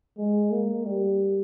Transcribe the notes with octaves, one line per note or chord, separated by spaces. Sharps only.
G#3
A#3
G3